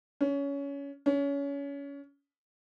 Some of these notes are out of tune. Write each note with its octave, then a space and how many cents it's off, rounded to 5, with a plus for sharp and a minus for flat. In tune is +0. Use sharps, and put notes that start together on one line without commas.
C#4 +20
C#4 +25